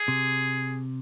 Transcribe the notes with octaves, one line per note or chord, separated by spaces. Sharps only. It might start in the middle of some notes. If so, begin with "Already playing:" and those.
Already playing: G#4
C3